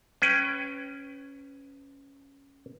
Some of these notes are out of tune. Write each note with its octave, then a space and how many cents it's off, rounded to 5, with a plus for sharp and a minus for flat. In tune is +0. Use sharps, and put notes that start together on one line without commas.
C#4 +0 B4 +25 G5 +0